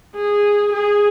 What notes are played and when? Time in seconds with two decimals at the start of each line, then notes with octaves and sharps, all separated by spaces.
0.15 G#4
0.73 G#4